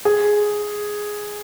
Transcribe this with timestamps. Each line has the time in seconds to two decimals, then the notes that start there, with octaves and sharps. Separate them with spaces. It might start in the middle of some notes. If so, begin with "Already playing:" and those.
0.05 G#4